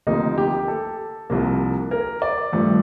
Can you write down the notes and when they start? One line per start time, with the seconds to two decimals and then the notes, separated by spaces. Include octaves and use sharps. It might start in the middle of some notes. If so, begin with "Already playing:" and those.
0.07 D2 C3 F3 A#3 D#4
0.38 G4
0.68 A4
1.30 C2 C3 F3 A#3
1.91 A#4
2.22 D5
2.52 G2 F3 A3